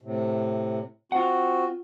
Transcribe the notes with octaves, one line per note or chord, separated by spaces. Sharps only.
A2 C3
C4 F4 F#4 F#5